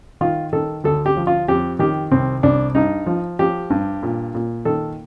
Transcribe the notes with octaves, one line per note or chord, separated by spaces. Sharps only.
D#3 F4
D#3 A4
D2 A4
G4
F3
F4
F2 G4
D#3 G4
C2 C4
C2 D4
G2 D#4
F3
F3 G4
G2
A#2
A#2
D#3 A4